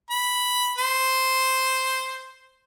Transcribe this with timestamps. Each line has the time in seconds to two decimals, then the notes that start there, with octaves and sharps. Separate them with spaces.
0.11 B5
0.78 C5